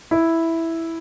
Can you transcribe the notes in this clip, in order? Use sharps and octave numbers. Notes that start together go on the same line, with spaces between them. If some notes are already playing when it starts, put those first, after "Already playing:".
E4